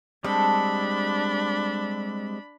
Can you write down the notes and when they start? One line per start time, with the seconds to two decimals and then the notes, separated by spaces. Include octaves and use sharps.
0.24 G3 G#3 C4 D4 A4 B5